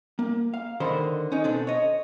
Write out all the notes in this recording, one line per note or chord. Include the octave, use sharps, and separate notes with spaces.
A#3
F5
D3 D#3 A#4 C5 B5 C6
C#4 D#4
B2 C4 D4 A4
C#5 D#5